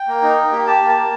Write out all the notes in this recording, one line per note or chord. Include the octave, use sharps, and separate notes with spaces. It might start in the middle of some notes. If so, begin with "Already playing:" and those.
Already playing: G5
A#3
D#4
A#3
G4
G4 A5
A#3
A5
A#3